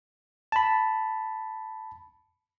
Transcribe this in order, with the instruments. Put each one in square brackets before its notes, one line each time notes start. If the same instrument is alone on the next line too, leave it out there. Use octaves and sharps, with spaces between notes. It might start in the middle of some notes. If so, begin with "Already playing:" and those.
[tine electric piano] A5 B5